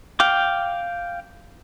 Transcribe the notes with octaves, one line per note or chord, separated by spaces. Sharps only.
F5 G5 D6